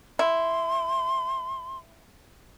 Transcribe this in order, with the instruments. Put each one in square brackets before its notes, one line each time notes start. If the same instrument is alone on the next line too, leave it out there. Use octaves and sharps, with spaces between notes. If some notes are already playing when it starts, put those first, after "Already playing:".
[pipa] E4 [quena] C6